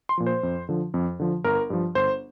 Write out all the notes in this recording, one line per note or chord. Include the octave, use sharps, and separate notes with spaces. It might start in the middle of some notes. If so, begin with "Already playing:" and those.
C6
A#2 F3
C5
F2
D3 F3
F2
D3 F3
G1 A#4
G2 F3
G1 C5